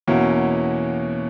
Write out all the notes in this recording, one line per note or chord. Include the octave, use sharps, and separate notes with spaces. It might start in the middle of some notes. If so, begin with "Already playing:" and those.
E2 B2 A#3 C#4 E4